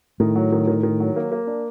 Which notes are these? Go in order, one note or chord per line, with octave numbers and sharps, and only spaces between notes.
A2 D#3
F#3
D#3
D#3
D#3
F#3
A#3
A#3
D4